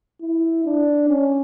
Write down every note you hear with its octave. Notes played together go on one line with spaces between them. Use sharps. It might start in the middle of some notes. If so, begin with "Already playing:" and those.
E4
D4
C#4